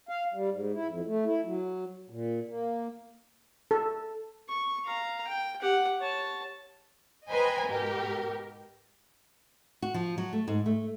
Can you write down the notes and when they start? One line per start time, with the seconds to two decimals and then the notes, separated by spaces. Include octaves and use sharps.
0.09 F5
0.34 G3
0.51 G#2
0.74 E4
0.88 F2
1.07 A3
1.26 E4
1.45 F#3
2.10 A#2
2.49 A#3
3.71 A4
4.49 C#6
4.85 F5 A#5
5.27 G5
5.61 G4 F#5
6.01 C#5 A5
7.28 B4 C5 D#5 G5 G#5 A#5
7.66 G#2 B2 G4 A#4
9.82 F#4
9.94 F3
10.18 F#3
10.33 A3
10.48 G#2
10.66 A3